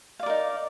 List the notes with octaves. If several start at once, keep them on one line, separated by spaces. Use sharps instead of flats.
D#4 A#4 D5 F5